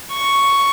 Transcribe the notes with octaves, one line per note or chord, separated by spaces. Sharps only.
C#6